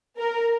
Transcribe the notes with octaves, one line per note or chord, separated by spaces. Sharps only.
A#4